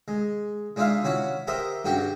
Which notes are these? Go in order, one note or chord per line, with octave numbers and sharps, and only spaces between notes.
G#3
G#3 D4 D#4 F4 E5 F5
C#4 E4 F#4 B5
G4 A#4 C5 D#5 E5
G2 C#3 F#4 G4 G5 C#6